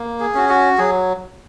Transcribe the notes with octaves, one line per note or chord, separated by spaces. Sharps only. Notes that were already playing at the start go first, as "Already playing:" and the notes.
Already playing: A#3
G#4
C#4 F#4
F#4
F#3 G#4